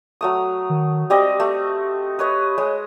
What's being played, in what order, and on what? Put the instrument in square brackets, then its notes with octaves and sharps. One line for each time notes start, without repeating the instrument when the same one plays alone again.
[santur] F#3 A3 D#6
[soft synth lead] D#3
[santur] G3 C4 D#5 [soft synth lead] G4
[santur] A3
B4 C#5 D#5
[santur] G#3 [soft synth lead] C#5